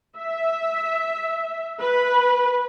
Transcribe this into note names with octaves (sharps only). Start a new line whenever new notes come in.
E5
B4